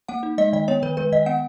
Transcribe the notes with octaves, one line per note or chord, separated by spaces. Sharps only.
A#3 F#5
D#4
G#3 D#5
D#3 D#5
B3 C#5
D#3 B4
G#3 B4
D#3 D#5
B3 F#5